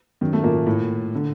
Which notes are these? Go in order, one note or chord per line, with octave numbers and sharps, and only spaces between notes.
F#2 D#3
A3
A#2 A#3
A2
D3